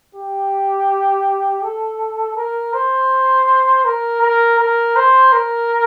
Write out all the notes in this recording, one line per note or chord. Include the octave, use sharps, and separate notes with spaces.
G4
A4
A#4
C5
A#4
A#4
A#4
C5
A#4